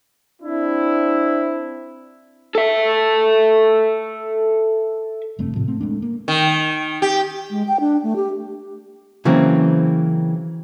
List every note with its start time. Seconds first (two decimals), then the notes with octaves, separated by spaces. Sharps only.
0.42 C4 D4 E4
2.55 A4 E5
5.39 F1 G2 A3 C4
5.55 A2 C3 F3
5.68 A3 C4
5.81 G#3 A3 D4
6.02 A#3
6.28 D#3
7.02 G4
7.50 G#3
7.68 G5
7.80 D4
8.03 A3
8.16 G4
9.25 C#3 E3 F#3 A#3 C4